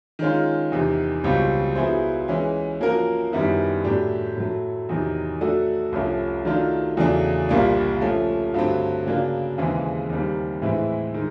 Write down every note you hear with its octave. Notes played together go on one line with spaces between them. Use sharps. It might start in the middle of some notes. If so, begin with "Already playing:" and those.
D#3 G#3 C#4 F4
E2 C3 D#3
C#2 B2 G3 C4
F#3 B3 E4 G#4 C5
E3 G#3 C#4
F3 A#3 C#4 F#4 A#4
F#2 D#3 G3 B3 E4
A2 F#3 A3 D4 G4
A2 F#3 A3
E2 C3 D#3 F#3
F#3 A3 D4 F#4 A4
C2 C3 F3 A3 C#4
D#3 F#3 A3 D4 F4
E2 C#3 F#3 A3 D4
C2 A#2 G3 A#3 D4
F3 A3 C#4
G2 D3 F#3 A3 C4
C#3 F#3 A#3 D4
D#2 C#3 E3 G#3 C4
D#2 D#3 G3 C4
A2 E3 G#3 C4 E4
D#3 G#3